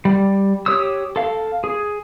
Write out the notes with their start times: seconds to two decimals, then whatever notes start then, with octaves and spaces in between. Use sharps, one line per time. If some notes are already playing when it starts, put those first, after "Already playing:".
0.05 G3
0.66 G4 C#5 D#6 E6
1.16 A4 F5
1.64 G#4